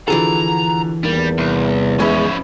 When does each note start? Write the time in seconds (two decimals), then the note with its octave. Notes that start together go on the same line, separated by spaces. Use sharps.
0.08 D3 E3 F3 F#4 G#4 A4 A#5
1.03 E2 D#3 G3 A#3
1.38 C2
2.00 A1 F3 G#3 C#4 E5 B5